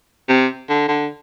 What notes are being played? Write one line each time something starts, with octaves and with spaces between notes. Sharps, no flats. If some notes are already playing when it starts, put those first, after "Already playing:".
C3
D3
D3